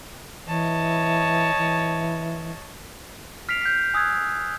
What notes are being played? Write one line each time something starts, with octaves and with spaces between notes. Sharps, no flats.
E3 C#5 D#5 A5
E3
F6 B6 C7 D7 F7
G6 B6
G#5 D#6 E6 F#6 G#6